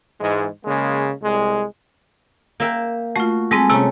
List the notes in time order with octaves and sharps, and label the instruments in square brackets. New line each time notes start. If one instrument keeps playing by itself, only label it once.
[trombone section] G#2 E3 G#3
C#3 G#3 A#3
C2 G#3
[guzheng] A#3 E5 G5
[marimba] A3 F4 [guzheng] F#4
[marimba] G3 G#3 C4 [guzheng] G#4 A4
[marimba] C3 A#5 [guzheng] A3 C#4